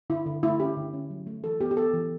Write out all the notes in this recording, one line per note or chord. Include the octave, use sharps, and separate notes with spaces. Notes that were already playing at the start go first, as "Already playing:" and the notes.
D3 E4
D3
A3 E4
C#4 G4
D3
C#4
F#3
A3
E3 A4
B3 G4
G4
B3 A4
E3